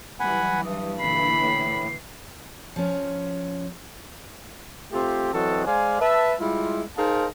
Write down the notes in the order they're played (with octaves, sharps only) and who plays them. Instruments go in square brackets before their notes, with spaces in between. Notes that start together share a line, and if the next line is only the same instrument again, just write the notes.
[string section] E3 F#3 G3 [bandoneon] F#5 G#5 B5
[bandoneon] G2 [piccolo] D#6
[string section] A#2 D3 E3 [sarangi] B5 [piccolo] C7
[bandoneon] A2
[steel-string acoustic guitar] F3 C#4
[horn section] A3 C4 F4 G4
E3 F#3 C4 F#4 A4 D#5
G#3 C5 D5 F5 G#5
B4 E5 A5
G3 G#3 E4 F4
D#4 G#4 A#4 C5 F5 A5